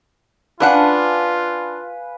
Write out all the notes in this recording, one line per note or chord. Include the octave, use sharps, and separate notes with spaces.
C#4 D4 F4 B4 F5 F#5 G#5